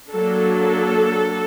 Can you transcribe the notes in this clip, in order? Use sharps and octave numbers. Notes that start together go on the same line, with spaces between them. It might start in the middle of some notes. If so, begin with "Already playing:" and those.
F#3 A#3 D4 A4